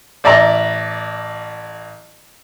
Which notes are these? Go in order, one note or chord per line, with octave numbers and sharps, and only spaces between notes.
A1 D5 E5 A#5